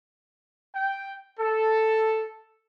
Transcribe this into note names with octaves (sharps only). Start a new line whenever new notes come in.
G5
A4